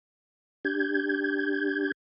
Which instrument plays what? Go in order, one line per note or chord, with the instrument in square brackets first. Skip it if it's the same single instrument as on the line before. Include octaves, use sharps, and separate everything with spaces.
[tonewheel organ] D4 G4 G6 G#6